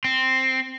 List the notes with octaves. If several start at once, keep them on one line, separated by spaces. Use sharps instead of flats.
C4